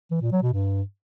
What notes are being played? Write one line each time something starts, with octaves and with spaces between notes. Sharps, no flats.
E3
A#2
F#3
B2
G2